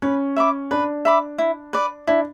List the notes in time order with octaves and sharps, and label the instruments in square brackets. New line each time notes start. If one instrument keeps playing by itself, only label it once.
[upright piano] C#4 [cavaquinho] B4
[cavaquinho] E5 B5 D6
[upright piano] D4 [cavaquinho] B4
[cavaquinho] E5 B5 D6
E4
B4 D5
[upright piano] D4 [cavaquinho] E4